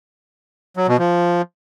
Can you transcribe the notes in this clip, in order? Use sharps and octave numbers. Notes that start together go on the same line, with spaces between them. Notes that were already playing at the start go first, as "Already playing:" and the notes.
F#3
B2
F3